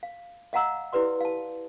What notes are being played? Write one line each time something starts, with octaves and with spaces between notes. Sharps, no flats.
F5
D#5 F5 F#5 A#5 E6
E4 G4 B4 D5 C6
F5 A5